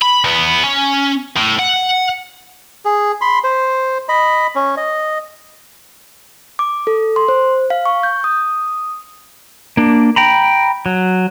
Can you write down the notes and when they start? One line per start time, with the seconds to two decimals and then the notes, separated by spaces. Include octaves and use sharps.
0.02 B5
0.24 E2 B3
0.63 C#4
1.37 A2
1.59 F#5
2.85 G#4
3.21 B5 C6
3.44 C5
4.09 D#5 B5
4.55 C#4
4.77 D#5
6.59 D6
6.87 A4
7.16 C6
7.28 C5
7.70 F5
7.85 C#6
8.03 G6
8.24 D#6
9.77 A#3 D4
10.16 G5 A#5 B5
10.86 F#3